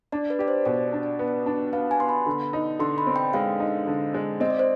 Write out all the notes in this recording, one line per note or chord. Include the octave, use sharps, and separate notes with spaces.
D4 D5
B4
G4 D5
C5
B2 D5
D4
B3
D4
B3 F5
G#5
B3 C6
B5
D3
D#4
D3 C6
B5
C4
G5
G#3 F5
D#4
D3
G#3
C4 D#5
D5
C5